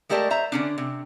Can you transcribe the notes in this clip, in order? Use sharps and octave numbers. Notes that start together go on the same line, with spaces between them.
G#3 A3 G4 A#4 D5 A5
C5 E5 A#5
D3 C#4 D4
C3